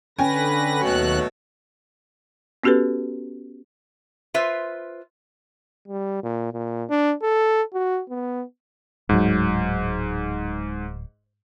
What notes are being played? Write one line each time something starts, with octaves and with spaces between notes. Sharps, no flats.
D3 C#4 B4 G5 G#5 A#6
D#2 B2 F#3 A3 F#6
B3 C#4 F#4 G4 A4 B4
F4 B4 C5 E5
G3
A#2
A#2
D4
A4
F#4
B3
D1 G#2 F#3